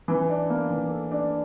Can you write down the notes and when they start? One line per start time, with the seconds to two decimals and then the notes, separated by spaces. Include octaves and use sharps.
0.08 E3
0.29 D4
0.50 A#3
0.70 E3
0.91 A4
1.12 D4